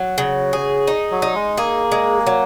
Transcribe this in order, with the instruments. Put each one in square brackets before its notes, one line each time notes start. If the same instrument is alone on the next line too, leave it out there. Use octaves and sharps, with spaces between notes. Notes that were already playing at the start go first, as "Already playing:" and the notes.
Already playing: [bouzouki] F#3
[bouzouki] C#3 [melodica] F#4
[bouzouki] G#4
D#4
[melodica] F#3
[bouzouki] D#4
[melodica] G#3
[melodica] A#3 [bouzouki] G#4
[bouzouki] G#3
F#3